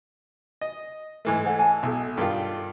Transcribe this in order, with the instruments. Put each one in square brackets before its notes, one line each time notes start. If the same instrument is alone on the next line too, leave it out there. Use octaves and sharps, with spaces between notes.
[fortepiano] D#5
G#2 E3 A3
[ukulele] A4 C5 F#5
G#5 A5
[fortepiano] B1 [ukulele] E4 A4
[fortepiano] G2 D#3 F4 [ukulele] D#4 A4